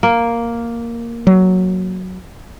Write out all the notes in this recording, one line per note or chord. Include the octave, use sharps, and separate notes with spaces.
A#3
F#3